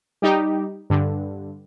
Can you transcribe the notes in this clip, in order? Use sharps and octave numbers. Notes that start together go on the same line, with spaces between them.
G3 D#4 G4
G2 D3